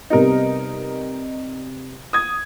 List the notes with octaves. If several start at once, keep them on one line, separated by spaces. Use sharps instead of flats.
C3 G3 B3 D#4 A#4
D#6 G#6